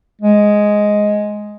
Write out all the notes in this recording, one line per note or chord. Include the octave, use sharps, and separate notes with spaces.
G#3